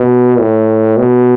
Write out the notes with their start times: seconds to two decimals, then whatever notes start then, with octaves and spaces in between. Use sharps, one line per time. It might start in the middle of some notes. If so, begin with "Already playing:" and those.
Already playing: B2
0.39 A2
0.97 B2